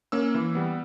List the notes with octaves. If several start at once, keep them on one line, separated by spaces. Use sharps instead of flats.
A#3 C#4 E6
E3
G3 B3